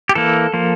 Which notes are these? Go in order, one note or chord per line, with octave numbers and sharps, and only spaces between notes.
G4
E3 A#3 A4
F3 A#3